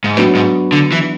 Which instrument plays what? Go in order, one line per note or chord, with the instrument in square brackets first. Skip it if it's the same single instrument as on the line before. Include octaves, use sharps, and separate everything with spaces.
[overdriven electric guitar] G#2
[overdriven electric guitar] A2 [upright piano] F#3 B3 D4 F#4
[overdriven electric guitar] G#2
D3
E3